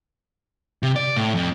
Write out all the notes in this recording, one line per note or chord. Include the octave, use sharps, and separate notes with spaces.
C3
D5
A2
F2